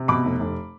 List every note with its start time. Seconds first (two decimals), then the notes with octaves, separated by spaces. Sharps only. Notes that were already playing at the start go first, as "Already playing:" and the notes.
Already playing: C3
0.08 B2 B5 D6
0.25 F1
0.40 F1